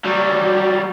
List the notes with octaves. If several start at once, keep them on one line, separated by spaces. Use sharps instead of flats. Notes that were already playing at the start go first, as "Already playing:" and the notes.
F#3 G3